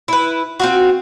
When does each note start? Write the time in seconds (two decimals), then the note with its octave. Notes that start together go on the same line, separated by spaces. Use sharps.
0.08 E4 B4
0.60 C4 F4 F#4